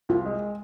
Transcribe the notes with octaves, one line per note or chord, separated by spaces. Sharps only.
C2 F4
G#3